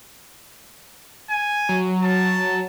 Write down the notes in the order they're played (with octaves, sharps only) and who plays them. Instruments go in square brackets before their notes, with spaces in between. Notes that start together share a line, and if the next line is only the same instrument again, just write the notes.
[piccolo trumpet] G#5
[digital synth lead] F#3
[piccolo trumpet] A5